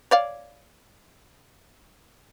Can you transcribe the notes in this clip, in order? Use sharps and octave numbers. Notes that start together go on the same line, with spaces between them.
C#5 D5 F5